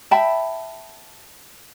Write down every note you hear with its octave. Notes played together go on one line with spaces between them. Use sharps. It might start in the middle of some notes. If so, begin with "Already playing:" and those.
E5 G5 A5 B5